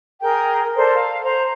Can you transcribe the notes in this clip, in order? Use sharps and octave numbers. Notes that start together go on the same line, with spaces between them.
G#4 A#4 G5
A4 A#4 C5 D5
F5
C5 A#5